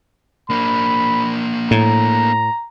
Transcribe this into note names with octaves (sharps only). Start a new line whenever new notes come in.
A#3 D4 B5
A2 A#5